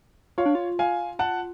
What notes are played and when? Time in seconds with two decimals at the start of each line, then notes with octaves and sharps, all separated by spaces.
0.38 F4 C#5 F5
0.46 D4
0.55 F4
0.79 F5 G#5
1.19 F#5 A5